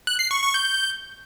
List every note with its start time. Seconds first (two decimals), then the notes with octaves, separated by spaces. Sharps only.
0.07 F#6
0.19 C7
0.31 C#6
0.43 C#6
0.54 G6